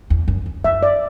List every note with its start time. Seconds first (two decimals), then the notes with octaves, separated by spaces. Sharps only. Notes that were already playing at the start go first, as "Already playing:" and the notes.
0.10 E2
0.28 F#2
0.46 E2
0.64 F#2 E5
0.83 D5